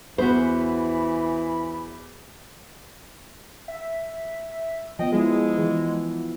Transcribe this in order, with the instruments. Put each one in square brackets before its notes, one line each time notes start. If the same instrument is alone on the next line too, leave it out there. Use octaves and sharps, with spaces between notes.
[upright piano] E2 [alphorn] E3 [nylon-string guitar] F#4 C5 [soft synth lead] B5
[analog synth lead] E5
[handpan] F3 B3 [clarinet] D#5 [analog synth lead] G5
[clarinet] G#3 [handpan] B3 E4 [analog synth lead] G#4
[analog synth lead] E3